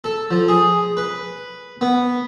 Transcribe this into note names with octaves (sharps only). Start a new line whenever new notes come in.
A4
F3
G#4
B4
B3